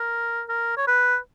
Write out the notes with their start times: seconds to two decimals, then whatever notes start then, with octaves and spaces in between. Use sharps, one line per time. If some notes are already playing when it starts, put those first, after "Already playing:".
Already playing: A#4
0.49 A#4
0.77 C#5
0.87 B4